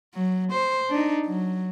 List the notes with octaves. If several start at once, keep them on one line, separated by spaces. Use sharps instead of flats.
F#3
C5
D4 D#4
F#3